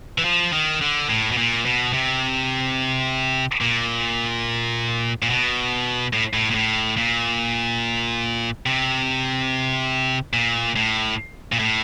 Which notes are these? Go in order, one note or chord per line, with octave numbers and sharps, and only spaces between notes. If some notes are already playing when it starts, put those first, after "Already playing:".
E3
F3
D#3
D3
A2
B2
A#2
B2
C3
A#2
A#2
B2
A2
A2
A#2
A2
A#2
C3
A#2
A2
A#2
A2